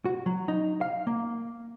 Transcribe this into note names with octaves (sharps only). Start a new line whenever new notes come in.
F#4
F#3
D#4
F5
A#3